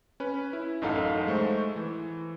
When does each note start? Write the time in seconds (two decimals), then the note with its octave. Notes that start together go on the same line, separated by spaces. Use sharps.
0.20 C#4 B4
0.53 E4
0.82 A1 F#2 D#4 A4 F5 F#5
1.27 G#3 A3 C5 C#6
1.76 E3